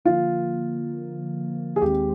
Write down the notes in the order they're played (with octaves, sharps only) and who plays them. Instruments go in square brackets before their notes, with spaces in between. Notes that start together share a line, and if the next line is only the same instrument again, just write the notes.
[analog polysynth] D3 F3 A#3 [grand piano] F4
[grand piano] G#4
[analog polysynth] D#2 D#3 G#3 C4 [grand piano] G4